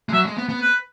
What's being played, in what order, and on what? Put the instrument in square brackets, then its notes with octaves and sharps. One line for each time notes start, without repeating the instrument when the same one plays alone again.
[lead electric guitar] G#3
[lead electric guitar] F#3 [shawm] E5
[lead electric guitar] G#3
B3
B3
[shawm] B4